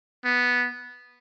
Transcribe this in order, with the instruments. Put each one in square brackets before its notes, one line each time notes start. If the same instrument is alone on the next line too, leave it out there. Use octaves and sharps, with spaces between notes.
[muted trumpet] B3